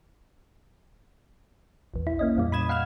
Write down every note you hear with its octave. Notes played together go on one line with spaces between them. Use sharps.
A#1 E2
E4
A#3 C#4 D#5
F2 A#2 G3
B5 D#6 G#6 E7
F5 F#5 B5 F6 G#6